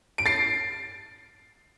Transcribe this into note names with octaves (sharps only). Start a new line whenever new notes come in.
D7
A6 C7